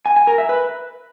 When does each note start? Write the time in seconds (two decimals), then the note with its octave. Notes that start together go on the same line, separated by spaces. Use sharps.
0.06 G#5
0.16 G#5
0.27 A#4
0.38 E5
0.49 B4